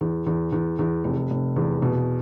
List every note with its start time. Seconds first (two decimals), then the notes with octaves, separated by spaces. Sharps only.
0.01 E2
0.26 E2
0.52 E2
0.79 E2
1.04 F1
1.30 F1
1.56 E2
1.82 B2